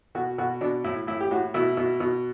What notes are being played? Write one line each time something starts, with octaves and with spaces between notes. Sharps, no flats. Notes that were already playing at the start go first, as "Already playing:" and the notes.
B2 F#4
B2 F#4
B2 D4
A2 E4
A2 E4
G4
A2 F#4
B2 E4
B2
B2